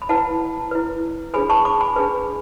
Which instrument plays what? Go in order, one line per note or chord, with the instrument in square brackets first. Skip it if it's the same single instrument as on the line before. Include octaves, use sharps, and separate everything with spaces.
[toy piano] B5
E4 B4 F#5 A5
E4 B4
D4 G#4 B4 G#5 B5
A5 C#6
B5 D6
G#5 B5
D4 G#4 B4